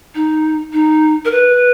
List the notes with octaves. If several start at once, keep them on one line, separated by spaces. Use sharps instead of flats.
D#4
D#4
A#4
B4